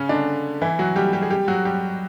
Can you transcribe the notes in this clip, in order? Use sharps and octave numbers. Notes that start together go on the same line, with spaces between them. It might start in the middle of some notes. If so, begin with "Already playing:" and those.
Already playing: C#3 C#4
D3 D4
E3 E4
F#3 F#4
G3 G4
G3 G4
G#4
G3 G4
F#3 F#4
G3 G4